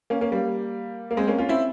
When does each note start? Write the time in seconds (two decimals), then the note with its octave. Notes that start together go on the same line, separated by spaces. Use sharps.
0.10 A#3 C#4
0.21 A#3 C#4
0.32 G3 A#3
1.11 A#3
1.17 G#3 C4
1.28 A#3 C#4
1.38 C#4 F4
1.49 C4 E4